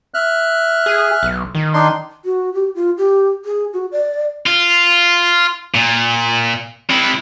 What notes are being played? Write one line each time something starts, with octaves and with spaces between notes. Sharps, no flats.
E5 F6 F#6
G#4
B1
D#3
D4 D#4 C6
F#4
G4
F4
G4
G#4
F#4
D5
F4
A#2
C3 E4